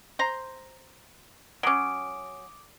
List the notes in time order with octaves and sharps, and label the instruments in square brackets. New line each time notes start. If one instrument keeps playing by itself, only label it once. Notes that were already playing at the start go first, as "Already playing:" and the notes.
[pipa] C5 A#5
[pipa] F#3 C#4 [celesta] D6 D#6 D7